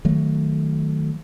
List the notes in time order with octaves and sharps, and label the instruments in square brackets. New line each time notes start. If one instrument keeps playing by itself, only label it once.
[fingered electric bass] D#3 F#3 A3